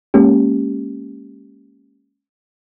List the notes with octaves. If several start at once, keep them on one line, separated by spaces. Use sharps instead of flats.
G#3 A#3 C#4 G4